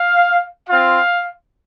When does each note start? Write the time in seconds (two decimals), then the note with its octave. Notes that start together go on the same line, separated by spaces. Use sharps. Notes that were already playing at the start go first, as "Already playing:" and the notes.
Already playing: F5
0.68 C4 F4 F5